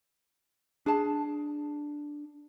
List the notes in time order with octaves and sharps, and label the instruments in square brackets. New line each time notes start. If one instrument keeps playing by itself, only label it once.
[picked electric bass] D4 [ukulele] G#4 A5